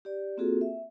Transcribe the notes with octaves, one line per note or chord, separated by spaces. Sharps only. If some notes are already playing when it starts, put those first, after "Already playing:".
G4 D5
A#3 C4 F4 F#4 G#4 A4
E5